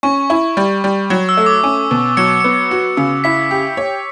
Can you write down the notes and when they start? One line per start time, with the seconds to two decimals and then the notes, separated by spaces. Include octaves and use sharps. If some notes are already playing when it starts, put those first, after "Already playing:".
0.03 C#4 C#6
0.30 E4
0.57 G3
0.84 G3
1.10 F#3
1.29 E6
1.37 A3
1.46 D6
1.64 C#4
1.91 B2
2.17 F#3 C#7
2.40 B3 C#7
2.71 F#4
2.97 C#3
3.24 E4 B6
3.51 G4
3.77 C#5